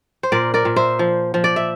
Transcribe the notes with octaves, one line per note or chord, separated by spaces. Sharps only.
C5
A#2 A#4 D5
A#4 D5
A#2
C5 E5
F3
F3
D5
E5